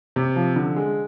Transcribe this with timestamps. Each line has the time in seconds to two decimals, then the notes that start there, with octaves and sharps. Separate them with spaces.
0.16 C3
0.36 F3
0.56 D3
0.76 G#3